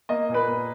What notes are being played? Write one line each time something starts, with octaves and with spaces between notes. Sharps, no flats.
A#3 D#5
A#2
B4 B5
A#3